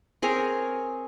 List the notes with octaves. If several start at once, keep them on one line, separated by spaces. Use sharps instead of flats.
C4 G#4 A#4 C#5